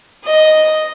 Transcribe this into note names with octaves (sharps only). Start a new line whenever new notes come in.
D#5